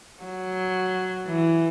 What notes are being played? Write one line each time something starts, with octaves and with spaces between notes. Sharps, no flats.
F#3
E3